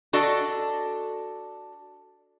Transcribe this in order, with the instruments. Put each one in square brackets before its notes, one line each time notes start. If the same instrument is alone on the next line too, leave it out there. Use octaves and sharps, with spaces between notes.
[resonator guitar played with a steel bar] D4 F#4 A4 D5 D#5